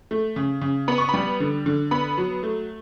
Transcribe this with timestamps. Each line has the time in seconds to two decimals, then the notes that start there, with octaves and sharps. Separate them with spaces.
0.11 A3
0.36 C#3
0.61 C#3
0.88 B3 B5
0.98 C#6
1.09 G3 B5
1.40 D3
1.66 D3
1.91 B3 B5
2.18 F#3
2.43 A3